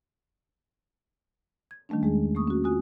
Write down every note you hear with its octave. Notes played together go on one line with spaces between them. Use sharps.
G#6
D#3 G3 A3 C#4 D4
E2 G#3 G#4
A3 A#3 C#6 D#6
C#4 F#4
C4 F4 F#4 G#5 D#6